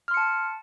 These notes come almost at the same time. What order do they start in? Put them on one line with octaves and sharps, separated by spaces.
F6 C6 C#7 A5